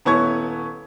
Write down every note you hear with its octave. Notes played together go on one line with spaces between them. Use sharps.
D#1 B3 E4 C#5 C#6 G#6